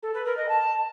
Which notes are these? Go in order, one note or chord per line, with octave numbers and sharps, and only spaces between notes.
A4
B4
A#4
D#5
A5